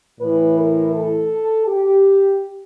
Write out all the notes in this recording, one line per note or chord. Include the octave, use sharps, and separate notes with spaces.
A2 E3 B4
A#4
A4
G4